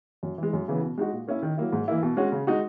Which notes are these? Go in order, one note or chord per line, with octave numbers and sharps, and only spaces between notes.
F#2
E3 G#3
F#2
C#3 E3 B3
B2
G#3 D#4 F#4
A#2
A#3 C#4 E4
D#3
F#3 A#3 E4
G#2
E3 A#3 E4
B2
G#3 C#4 F#4
C#3
G#3 D#4 F#4